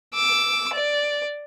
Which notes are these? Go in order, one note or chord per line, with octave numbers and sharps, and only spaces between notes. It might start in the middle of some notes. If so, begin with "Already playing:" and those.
D6 E6
D5